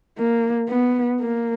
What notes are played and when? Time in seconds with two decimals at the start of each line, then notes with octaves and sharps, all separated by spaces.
0.18 A#3
0.69 B3
1.20 A#3